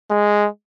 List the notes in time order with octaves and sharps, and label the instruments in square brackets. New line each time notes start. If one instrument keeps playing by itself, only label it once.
[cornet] G#3